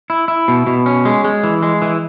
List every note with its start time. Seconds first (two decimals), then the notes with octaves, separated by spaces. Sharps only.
0.10 E4
0.28 E4
0.48 B2
0.66 B2
0.86 C#4
1.05 G#3
1.24 G#3
1.44 E3
1.62 G#3
1.82 E3